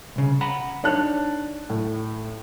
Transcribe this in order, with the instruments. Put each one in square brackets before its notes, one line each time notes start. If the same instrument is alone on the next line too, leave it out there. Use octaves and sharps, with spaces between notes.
[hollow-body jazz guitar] C2 C#3
F#5 A#5 B5
[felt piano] D4 A5 F#6 [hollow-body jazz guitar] D#4 C#5
[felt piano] A2